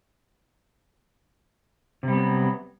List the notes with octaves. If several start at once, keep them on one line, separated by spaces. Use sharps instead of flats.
C3 F#3 G3 B3